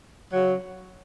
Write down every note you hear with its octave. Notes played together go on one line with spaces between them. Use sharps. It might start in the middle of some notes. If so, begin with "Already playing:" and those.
C#3 F#3